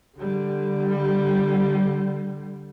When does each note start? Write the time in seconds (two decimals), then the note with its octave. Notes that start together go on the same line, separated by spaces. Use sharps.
0.17 D3 G3